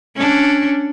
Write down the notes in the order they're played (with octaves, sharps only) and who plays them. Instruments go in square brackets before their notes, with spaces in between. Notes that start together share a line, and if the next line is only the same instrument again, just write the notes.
[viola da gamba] C#4 D4